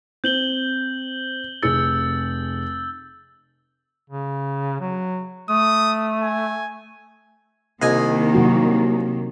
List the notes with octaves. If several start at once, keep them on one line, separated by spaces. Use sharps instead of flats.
C4 G6 F#7 G7
F1 G#4 E6 A6 C#7
C#3
F#3
A3 D#6
G#5
C2 D#3 A#3 D#5 G#5
C3 F#3 F#4